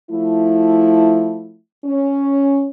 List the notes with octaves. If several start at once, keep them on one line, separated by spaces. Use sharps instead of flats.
F3 A3 E4
C#4